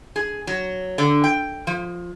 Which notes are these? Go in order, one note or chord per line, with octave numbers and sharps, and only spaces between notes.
G#4
F#3
D3
G5
F3